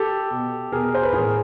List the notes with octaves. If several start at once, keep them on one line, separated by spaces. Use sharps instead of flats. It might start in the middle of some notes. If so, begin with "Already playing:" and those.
Already playing: G4 A4
B2
B2 G#4 A#4
C5
B4
A2 E3 G#4 A#4